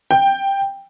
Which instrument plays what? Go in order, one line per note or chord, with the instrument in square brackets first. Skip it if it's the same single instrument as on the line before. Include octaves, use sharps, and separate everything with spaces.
[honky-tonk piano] G5